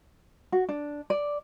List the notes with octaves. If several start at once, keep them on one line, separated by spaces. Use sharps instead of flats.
F#4
D4
D5